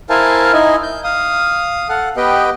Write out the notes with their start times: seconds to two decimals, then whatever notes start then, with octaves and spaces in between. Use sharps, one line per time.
0.10 E4 A#4 C5 F5 G#5 A5
0.53 D#4 E4 D#5 G#5
0.83 G6
1.04 F5 D#6
1.89 A4 F5 F#5
2.17 B3 G4 B4 D#5 G5